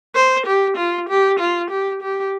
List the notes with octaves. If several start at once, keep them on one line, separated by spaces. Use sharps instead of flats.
C5
G4
F4
G4
F4
G4
G4